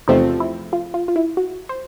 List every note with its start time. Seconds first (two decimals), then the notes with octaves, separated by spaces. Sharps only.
0.08 E2 C3 F3 A3 C4 D#4
0.40 E4
0.73 F4
0.94 F4
1.08 F4
1.16 E4
1.37 F#4
1.69 C5